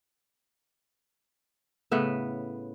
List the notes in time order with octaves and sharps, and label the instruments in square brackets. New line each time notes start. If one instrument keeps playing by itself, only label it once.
[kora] A2 C#3 B3 E5